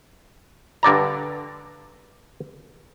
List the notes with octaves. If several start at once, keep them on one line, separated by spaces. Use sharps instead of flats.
G2 D3 D5 A#5